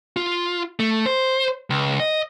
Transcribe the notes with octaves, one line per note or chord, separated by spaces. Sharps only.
F4
A3
C5
C#2
D#5